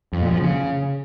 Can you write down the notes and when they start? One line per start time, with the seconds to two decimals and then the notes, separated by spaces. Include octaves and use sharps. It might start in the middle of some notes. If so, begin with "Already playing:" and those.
0.13 F2
0.22 A#2
0.31 F3
0.40 C#3